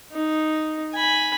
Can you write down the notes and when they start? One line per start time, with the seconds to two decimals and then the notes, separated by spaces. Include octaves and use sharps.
0.12 D#4
0.93 G#5 B5